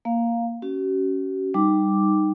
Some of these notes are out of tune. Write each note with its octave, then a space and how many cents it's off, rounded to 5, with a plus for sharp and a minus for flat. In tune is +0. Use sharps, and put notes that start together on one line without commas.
A#3 +0 F5 +0
C#4 +5 F#4 +45
G3 +0 D#4 -10 D6 +0